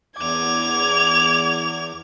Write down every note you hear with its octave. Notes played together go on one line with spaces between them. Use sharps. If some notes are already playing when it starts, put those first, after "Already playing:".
E2 D6 G#6 F7